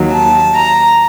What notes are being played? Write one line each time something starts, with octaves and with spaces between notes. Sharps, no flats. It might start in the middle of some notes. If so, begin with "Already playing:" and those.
Already playing: D#2 D#3 F#3
A5
A#5